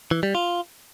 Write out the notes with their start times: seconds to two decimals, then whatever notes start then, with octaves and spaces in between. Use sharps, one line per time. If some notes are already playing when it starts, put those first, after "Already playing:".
0.11 E3
0.23 G3
0.35 F4